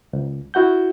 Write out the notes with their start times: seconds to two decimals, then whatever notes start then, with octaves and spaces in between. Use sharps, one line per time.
0.13 C#2
0.54 E4 F#4 F#5 G6